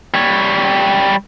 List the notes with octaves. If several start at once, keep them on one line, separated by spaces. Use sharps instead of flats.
G3 C#5